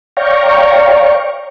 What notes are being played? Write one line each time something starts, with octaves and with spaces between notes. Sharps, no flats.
C#5 D5 F5 G5 A#5 C#6